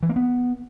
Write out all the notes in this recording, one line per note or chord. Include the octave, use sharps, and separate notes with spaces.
E3
A#3
B3